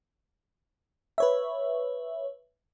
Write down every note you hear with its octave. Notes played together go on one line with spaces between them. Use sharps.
B4 C#5 E5